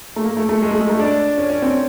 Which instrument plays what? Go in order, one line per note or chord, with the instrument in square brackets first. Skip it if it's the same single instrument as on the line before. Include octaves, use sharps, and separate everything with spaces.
[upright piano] A3
A#3
A3
A3
G#3
A3
G#3
A3
D4
C#4
C#4
C4